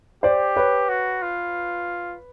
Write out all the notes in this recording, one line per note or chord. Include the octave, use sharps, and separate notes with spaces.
G4 C5 D5
B4 C#5
F#4
F4